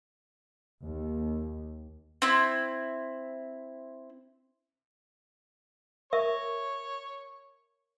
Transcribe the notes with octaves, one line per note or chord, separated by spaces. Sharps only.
D#2
C4 E4
A#4 C#5 E5 C#6